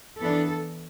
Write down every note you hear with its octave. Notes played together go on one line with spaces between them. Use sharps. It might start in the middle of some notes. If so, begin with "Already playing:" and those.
E3 B3 D4 A4